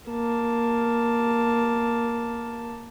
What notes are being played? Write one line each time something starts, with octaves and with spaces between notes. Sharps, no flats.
A#3 A5